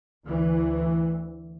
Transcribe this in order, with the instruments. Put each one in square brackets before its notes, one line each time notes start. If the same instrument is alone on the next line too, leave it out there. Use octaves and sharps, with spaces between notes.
[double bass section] D2 E3